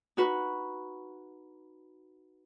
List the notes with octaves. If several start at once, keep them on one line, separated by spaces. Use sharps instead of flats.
D#4 F#4 B4